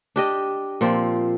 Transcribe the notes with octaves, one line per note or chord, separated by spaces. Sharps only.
D4 G4 D#5
A#2 F3 C4